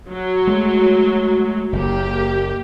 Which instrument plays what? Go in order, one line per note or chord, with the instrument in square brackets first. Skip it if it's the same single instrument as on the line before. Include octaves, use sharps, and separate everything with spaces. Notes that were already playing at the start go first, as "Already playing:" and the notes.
[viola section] F#3
[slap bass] G#3 A3
[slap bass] F#1 [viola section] A#3 G4